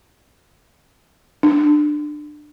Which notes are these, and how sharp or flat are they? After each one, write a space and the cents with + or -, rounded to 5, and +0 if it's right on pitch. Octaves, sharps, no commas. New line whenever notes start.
D4 +20